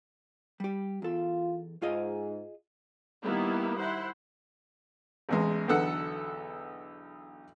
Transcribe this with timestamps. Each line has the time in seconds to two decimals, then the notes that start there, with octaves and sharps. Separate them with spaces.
0.60 G3 G4
1.02 E2 F4 A4
1.82 G#2 F4 G#4 D#5
3.23 D#3 G3 A#3 B3 E4
3.79 E4 C5 F#5
5.29 A1 E2 G#3
5.68 B1 E2 D3 A4 F#5